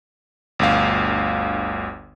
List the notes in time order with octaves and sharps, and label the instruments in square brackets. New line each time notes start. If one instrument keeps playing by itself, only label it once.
[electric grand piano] G1 D2 F5